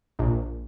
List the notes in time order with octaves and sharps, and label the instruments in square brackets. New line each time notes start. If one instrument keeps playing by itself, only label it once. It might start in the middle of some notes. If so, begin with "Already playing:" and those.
[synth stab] A#1